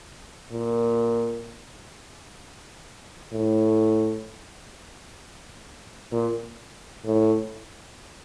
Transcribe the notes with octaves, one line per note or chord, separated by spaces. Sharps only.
A#2
A2
A#2
A2